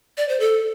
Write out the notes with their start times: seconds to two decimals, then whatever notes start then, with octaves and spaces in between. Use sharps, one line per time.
0.17 D5
0.29 C5
0.40 A4